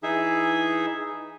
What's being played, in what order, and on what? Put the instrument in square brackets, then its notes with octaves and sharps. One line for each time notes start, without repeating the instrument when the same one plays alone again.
[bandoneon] E3 D#4 G#4 E5